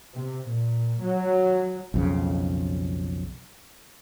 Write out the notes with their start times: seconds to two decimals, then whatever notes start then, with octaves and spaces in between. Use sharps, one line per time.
0.15 C3
0.48 A#2
1.01 F#3
1.94 B1 F2 C#3